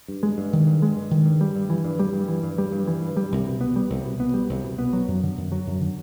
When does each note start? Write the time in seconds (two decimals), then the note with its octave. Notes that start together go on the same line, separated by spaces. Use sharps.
0.08 G2
0.23 G#3
0.38 G2
0.53 D#3
0.67 G2
0.82 G#3
0.97 G2
1.11 D#3
1.26 G2
1.41 G3
1.56 G2
1.70 E3
1.85 G2
2.00 G3
2.14 G2
2.28 E3
2.43 G2
2.58 G3
2.72 G2
2.87 E3
3.02 G2
3.17 G3
3.32 C2
3.46 B2
3.61 B3
3.76 G3
3.90 C2
4.04 B2
4.20 B3
4.34 G3
4.49 C2
4.64 B2
4.78 B3
4.93 F#3
5.08 F#2
5.23 D3
5.37 F#2
5.52 F#3
5.66 F#2
5.81 D3